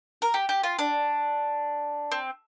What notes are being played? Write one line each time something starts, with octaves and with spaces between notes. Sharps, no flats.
A#4
G4
G4
F4
D4
C4